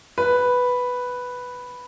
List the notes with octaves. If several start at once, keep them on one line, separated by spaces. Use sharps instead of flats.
B4